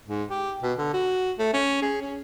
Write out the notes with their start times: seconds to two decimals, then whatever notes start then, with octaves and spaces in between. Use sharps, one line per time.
0.08 G#2
0.30 G4
0.63 B2
0.78 D3
0.93 F#4
1.39 A3
1.53 C#4
1.82 G#4
2.02 C#4